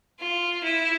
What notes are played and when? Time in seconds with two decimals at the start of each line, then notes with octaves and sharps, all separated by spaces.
0.20 F4
0.64 E4